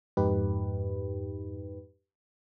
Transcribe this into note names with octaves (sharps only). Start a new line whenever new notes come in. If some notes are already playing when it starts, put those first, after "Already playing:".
F2 G#2 D#4 G4 B4